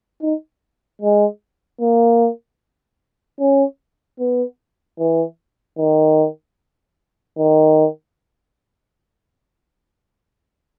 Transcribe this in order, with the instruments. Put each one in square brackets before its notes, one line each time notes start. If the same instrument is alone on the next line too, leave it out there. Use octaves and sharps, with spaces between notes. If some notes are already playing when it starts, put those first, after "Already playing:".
[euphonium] D#4
G#3
A#3
C#4
B3
E3
D#3
D#3